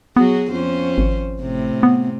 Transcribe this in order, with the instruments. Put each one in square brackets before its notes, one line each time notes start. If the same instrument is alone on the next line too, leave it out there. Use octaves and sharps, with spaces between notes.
[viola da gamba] F#3 F#4 G#4 [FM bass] B3
[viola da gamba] F2 C#4 C5
[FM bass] G#1
[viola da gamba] A2 C3
[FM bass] B3